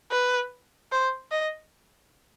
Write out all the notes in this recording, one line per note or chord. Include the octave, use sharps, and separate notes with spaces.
B4
C5
D#5